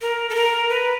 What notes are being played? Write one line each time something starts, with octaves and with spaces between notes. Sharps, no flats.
A#4
A4
A#4
B4